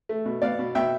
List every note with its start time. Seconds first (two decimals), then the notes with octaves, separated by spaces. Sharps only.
0.09 A3
0.26 B2
0.42 B3 D5 F5
0.59 B2
0.75 B2 E5 G5